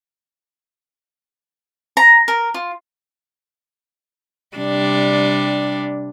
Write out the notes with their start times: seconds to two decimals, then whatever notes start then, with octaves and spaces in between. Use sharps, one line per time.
1.97 A#5
2.28 A#4
2.54 F4
4.57 C3 G3 D4